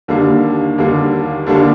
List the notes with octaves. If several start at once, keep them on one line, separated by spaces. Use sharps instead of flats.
D#2 D3 G3 A#3 D4
D#2 D3 G3 A#3 D4
D#2 D3 G3 A#3 D4